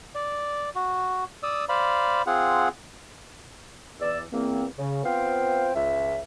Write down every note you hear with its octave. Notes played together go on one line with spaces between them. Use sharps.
D5
F#4
D5 D#6 E6
C5 D5 F5 B5
C4 F4 G#4 F#5
E2 D5 E6
E2 A#3 C4
C#3
B3 C4 F4 C5 F5 G5
C#2 E5